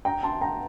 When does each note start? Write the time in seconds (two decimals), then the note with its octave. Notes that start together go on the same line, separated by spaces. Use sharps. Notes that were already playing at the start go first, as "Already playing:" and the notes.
0.05 G5 A#5
0.23 A5 C6
0.41 G5 A#5